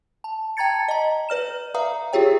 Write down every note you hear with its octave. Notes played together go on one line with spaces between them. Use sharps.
A5
G5 A5 A#5 G#6 A6 C#7
D#5 A#5
B4 D5 F6 E7
B4 E5 F5 A#5 D#6
F4 G4 G#4 C#5 G5